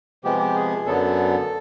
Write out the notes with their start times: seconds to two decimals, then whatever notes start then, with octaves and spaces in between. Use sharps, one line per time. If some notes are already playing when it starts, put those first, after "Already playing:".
0.24 C3 F3 G#3 B3 G4
0.39 G4
0.55 G#4
0.86 F#2 D3 F#3 B3 A4